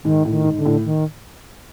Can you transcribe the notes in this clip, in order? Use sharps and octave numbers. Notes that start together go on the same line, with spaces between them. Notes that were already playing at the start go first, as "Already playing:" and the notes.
G#2 D#3
A2
D#3
G#2
D3
A2
D#3